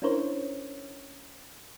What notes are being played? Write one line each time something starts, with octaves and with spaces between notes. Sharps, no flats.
C#4 D4 E4 A#4 C5 C#5